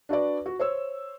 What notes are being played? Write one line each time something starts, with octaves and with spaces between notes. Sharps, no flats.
D4 F#4 B4 D5
F#4
C5 C#5 E6